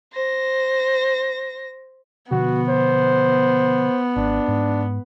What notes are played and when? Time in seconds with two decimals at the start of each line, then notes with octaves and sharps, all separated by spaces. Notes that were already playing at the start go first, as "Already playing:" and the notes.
0.13 C5 A#6
2.31 B2 D3 F3 B3 F#4
2.69 C5
4.17 G#1 D4
4.48 G#2